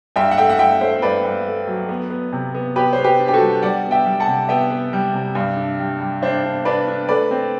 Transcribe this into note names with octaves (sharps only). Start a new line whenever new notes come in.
G2 E5 G5
F#5
A3 E5 G5
F#5
G2 E5 G5
A3 C5 E5
G2 B4 D5
G2
A3
F#3
B3
B3
C3
B3
B3 G4 B4
C5
B3
G4 B4
D4
G4
F#4 A4
G3
G3 D5 F#5
B3
E5 G5
G3
F#5 A5
C3
B3 E5 G5
B3
G3
C3
G2
D4
G3
G3
D4 C5 E5
D4
D4 B4 D5
D4
A3 B4 D5
C4